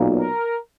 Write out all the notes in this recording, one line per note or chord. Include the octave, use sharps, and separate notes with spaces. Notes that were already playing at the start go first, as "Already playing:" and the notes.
Already playing: B1 A#2
A#4